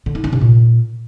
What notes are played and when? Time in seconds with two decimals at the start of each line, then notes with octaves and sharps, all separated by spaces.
0.06 D3
0.15 D#4
0.24 D4
0.33 C3
0.41 A#2